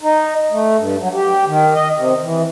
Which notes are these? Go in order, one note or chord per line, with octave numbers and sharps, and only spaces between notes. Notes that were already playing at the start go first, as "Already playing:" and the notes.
D#4
A3
G2
F#3
G4
D#3
D#5
C3
E3